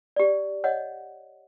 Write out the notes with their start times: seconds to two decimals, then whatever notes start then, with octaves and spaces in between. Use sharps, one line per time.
0.16 G4 D5
0.64 C#5 D#5 F#5